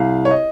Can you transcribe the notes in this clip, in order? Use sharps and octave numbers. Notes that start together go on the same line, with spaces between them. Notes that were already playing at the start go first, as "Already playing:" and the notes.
Already playing: C2 F5
C#5
D#5